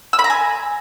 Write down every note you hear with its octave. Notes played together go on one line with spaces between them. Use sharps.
E6
B5
A#5
G#5